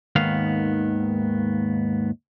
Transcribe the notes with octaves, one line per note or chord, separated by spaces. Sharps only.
D#2 G#2 D#3 B3 F5